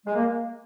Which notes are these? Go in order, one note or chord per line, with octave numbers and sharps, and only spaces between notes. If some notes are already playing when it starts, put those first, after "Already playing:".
G#3
A#3